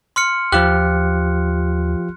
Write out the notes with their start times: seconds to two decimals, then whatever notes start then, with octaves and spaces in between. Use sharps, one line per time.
0.16 C6 F6 C#7
0.52 D#2 F3 F4 G4 F#6